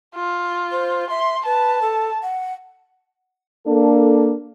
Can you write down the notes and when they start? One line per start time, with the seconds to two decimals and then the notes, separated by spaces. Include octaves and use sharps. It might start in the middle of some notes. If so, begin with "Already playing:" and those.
0.15 F4
0.71 C5
1.10 E5 C6
1.45 B4 A5
1.82 A4
2.23 F#5
3.66 A#3 D4 A4